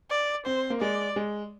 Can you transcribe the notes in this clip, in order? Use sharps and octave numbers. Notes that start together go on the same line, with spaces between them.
D5
C4 C5
A#3
G#3 D5
G#3